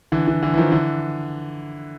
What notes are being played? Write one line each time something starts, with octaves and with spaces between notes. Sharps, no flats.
D3 E3
D3 E3
D3 E3
E3
D#3 F3
D3 E3